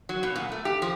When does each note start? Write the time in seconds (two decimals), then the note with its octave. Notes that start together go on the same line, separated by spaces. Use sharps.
0.09 F#3
0.23 B2
0.36 A#2
0.52 A3
0.65 G4
0.82 F3